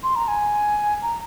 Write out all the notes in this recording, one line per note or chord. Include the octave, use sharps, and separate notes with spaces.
C6
A#5
G#5
A#5